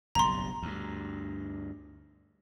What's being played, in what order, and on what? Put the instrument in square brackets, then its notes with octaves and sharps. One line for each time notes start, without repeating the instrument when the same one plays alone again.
[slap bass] F#1 B1 G2 [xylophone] A#5 C6
[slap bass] D2 G2